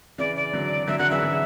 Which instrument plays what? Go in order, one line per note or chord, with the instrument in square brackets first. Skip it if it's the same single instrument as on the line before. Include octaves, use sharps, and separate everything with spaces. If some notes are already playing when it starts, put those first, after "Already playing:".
[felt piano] C#3 E3 [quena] D5
[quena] D5
[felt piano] D3 F#3
[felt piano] D3 F#3 [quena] E5
[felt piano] D3 F#3 [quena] F#5
[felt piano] C#3 E3 [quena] E5
[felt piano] D3